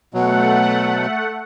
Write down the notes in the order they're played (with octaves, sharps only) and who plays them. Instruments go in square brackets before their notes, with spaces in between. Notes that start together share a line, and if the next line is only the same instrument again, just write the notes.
[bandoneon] B2 F#3 [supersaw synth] A3 F#5